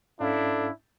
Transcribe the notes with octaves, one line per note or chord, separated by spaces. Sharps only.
G#2 C#4 D4 E4 A4 F5